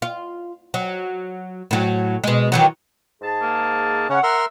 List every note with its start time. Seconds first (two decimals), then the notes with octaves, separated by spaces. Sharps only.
0.02 F4
0.74 F#3
1.71 A2 F#3
2.24 B2 G#3
2.52 D#3 E3 F#3
3.22 G#2 G#4 A5
3.42 A#3
4.10 C#3 C#4 C#5 F#5
4.23 A#4 E5 C6 F6